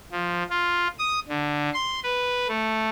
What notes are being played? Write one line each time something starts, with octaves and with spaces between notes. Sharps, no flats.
F3
F4
D#6
D3
C6
B4
A3